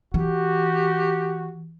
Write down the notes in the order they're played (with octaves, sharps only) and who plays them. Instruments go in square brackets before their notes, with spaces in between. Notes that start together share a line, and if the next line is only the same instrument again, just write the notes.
[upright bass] E3 [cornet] F#4 [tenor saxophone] G4